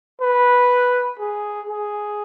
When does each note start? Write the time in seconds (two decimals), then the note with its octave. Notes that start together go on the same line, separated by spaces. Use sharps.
0.21 B4
1.20 G#4
1.69 G#4